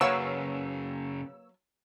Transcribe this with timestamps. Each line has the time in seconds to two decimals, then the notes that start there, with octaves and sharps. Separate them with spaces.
0.01 F#2 C#3 F#3 A#3 B4 C#5 F5 E6